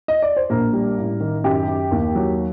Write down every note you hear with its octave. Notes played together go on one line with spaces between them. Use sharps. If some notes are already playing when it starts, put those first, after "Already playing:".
D#5
D5
C5
A#1 A#3 A#4
G3
A1
D#3
F#2 G4
F#2
D#2
F#3